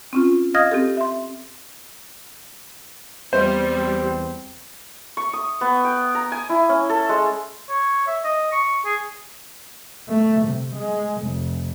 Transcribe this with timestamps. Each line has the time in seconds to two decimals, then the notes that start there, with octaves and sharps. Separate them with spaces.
0.13 C4 C#4 F4
0.55 D#5 F5 D#6 F6 G#6 A#6
0.71 C4 G4 A4
0.97 E5 C6
3.33 E2 G3 C4 C5
5.17 C#6
5.33 D#6
5.61 B3
5.85 G5
6.15 A#5
6.32 G#5
6.49 E4
6.69 C#4
6.90 A4
7.09 G#3
7.69 C#5
8.07 E5
8.24 D#5
8.52 C#6
8.85 G#4
10.09 A3
10.47 C3
10.76 G#3
11.23 F1